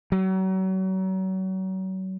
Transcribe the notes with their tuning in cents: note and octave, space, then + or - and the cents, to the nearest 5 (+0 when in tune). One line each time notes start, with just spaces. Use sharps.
F#3 +35